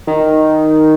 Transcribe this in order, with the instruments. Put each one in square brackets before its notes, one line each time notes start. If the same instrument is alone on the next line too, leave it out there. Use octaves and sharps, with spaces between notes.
[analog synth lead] D#3